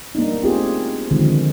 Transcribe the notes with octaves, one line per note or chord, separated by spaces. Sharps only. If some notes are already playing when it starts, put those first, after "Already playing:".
G3 A#3 B3 D4 D#4
A3 C4 F4 G4 G#4
D3 D#3 F3 G#3 C4